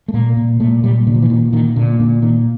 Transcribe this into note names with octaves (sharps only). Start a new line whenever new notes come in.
A3
A#2 A#3
A#2
A#2 A3
A#2 G3
A#2 D3
F3
E3
A#2 D#3
A#2 D#3
A#2 D3
A#2 D3
A#2 D#3